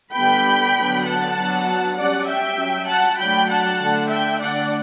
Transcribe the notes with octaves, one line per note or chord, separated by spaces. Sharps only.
D3 G3 B3 G5 B5
D3 F#3 B3 D4
F#5 A5
F#3 B3 D4
G3 C#4 D5 F#5
E5 G5
F#3 C#4
F#5 A5
F#3 A3 D4 G5 B5
F#5 A5
D3 A3 D4
E5 G5
D3 A3 D4 D5 F#5